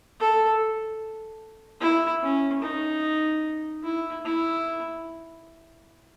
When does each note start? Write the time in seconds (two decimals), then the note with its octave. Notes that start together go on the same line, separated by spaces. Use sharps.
0.20 A4
1.81 E4
2.23 C#4
2.62 D#4
3.84 E4
4.25 E4